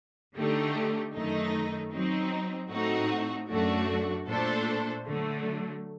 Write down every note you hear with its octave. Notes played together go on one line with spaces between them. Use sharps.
D3 A3 D#4 G4
F#2 D#3 A3 D#4
F#3 C4 D#4
A2 A3 C4 D#4 F#4
F#2 F#3 A3 D4 F#4
A#2 A3 D4 A4 C5
D3 F#3 A3